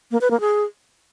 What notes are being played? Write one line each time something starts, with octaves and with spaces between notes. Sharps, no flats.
A#3
B4
A#3
G#4